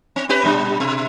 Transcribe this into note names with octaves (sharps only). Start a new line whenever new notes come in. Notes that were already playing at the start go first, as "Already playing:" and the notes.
C4
C4 G4 B4
A#2 G3 D4
B2